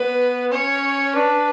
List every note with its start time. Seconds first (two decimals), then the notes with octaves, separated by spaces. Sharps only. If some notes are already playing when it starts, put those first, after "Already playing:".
Already playing: B3 B4
0.52 C#4 C#5
1.16 D4 B4